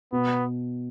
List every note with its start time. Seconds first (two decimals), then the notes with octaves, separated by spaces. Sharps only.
0.12 B2 B3